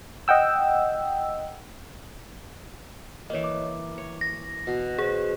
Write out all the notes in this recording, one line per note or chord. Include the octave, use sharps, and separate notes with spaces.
D#5 F#5 G5 E6
E3 A#3 C#5 D#5
D6
C#5
A#6
B2
G#4 C5 F#5